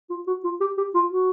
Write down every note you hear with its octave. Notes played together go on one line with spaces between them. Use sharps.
F4
F#4
F4
G4
G4
F4
F#4